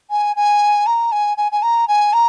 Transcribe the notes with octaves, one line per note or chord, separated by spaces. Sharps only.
G#5
G#5
A#5
G#5
G#5
G#5
A#5
G#5
A#5